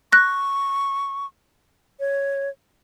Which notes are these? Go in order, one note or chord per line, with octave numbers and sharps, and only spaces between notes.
C#6 F#6 A#6
C#5